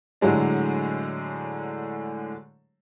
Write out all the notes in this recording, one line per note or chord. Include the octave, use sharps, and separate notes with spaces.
A2 D3 F#3 G#3 D4